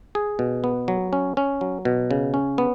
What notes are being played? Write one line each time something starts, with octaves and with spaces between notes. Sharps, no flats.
G#4
B2
B3
F#3
C#4
C#4
F#3
B2
C#3
C#4
B3